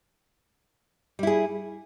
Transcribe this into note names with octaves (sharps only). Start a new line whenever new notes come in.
G3 E4 G#4